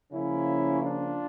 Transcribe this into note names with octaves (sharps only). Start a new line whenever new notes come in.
C#3 F3 A#3 C#4 E4
D4 F4